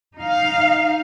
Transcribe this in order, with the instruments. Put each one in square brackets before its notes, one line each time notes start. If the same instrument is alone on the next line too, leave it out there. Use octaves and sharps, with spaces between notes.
[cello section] D#4 F5